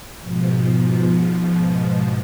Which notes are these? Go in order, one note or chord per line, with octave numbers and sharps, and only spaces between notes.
G#2 B2 F3